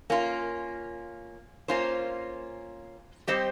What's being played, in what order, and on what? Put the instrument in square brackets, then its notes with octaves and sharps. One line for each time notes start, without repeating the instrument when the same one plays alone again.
[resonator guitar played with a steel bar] A#3 C#4 F4
A#3 C#4 F4 C5
G3 C4 G4 C5 D#5